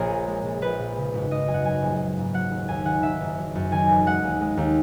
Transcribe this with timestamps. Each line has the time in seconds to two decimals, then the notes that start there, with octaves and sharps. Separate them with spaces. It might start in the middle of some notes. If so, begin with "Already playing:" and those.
Already playing: A#1 G#4 A#4 C#5
0.10 A#2
0.27 G#3
0.44 A#1
0.62 A#1 B4
0.79 A#2
0.96 C#3
1.14 G#1
1.31 G#1 D#5
1.47 F#2 G#5
1.54 F#5
1.65 F#3 G#5
1.82 A#1
2.00 A#1
2.17 G#2
2.34 F#3 F#5
2.51 D#2
2.68 D#2 G#5
2.85 D#3 F#5
3.03 D#3 E5
3.20 F#1
3.38 F#3
3.55 F#2
3.72 D#3 G#5
3.89 E1
4.06 G#3 F#5
4.24 D#2
4.41 G#3
4.57 D#2